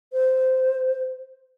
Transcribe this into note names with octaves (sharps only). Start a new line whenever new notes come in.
C5